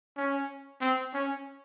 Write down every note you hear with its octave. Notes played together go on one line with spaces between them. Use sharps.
C#4
C4
C#4